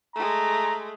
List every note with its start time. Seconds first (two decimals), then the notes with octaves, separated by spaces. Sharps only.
0.15 G#3 A3 A#5